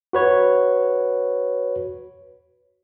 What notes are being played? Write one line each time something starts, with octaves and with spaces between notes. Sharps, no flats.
F#4 B4 C#5